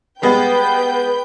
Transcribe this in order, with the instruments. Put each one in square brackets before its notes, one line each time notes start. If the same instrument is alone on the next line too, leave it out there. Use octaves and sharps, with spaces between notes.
[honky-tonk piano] G3 G#3 B3 [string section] B4 G5 G6